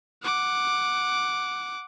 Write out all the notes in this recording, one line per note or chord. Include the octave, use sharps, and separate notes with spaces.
F#5 D6